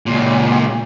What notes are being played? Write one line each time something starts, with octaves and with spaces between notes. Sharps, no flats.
C#2 A#2